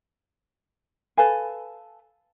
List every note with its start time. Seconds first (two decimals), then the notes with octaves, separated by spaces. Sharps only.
1.17 A4 B4 F5 G#5